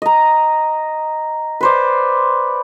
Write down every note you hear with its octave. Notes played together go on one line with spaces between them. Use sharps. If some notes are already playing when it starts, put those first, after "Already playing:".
D#5 A#5
B4 C5 D5